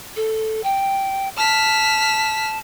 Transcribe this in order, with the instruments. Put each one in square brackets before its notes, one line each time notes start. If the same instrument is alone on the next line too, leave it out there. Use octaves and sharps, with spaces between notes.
[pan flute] A4
G5
[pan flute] A5 [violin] F6 B6